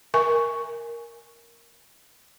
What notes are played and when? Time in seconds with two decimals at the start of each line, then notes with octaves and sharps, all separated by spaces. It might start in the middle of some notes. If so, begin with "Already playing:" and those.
0.14 A#4 G#5 C#6